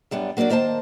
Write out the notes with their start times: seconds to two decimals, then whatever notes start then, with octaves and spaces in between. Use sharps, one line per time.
0.11 F#2 G3 B3 D4
0.37 F#3 A#3 D4 F#4 D5
0.49 D#3 A#3 C5 C#5 A5